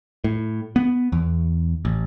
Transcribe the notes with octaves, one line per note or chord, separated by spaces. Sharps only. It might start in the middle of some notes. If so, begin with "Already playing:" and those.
A2
B3
E2
A1